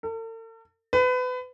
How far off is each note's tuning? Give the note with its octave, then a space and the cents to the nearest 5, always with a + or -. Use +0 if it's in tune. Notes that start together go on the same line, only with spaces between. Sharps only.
A4 +45
B4 +30